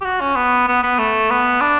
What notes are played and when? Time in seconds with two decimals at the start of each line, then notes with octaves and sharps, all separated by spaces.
0.01 G4
0.05 F#4
0.21 C#4
0.36 B3
0.68 B3
0.83 B3
0.99 A3
1.30 B3
1.61 D4